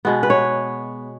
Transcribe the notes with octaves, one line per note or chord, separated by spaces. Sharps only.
B2 G#3 B3
B4
C#5